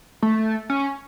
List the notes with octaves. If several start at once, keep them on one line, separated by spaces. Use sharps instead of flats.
A3
C#4